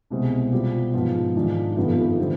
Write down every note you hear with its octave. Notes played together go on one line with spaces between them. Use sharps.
C2 B2 G#3 C4
B2 G3 C4 F4
G#2 F3 B3 F4
G#2 D#3 G#3 D4 F4
G1 F2 D#3 B3 F4
D3 G3 C4